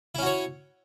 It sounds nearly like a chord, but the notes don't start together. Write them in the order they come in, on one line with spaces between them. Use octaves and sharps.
E4 C#4 F#4 C#5